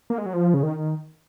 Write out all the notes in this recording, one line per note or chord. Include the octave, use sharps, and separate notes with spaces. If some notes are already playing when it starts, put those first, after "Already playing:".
A#3
G#3
F#3
F3
C#3
D#3